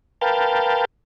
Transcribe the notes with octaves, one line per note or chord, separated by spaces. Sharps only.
A#4 B4 F5 G5 A5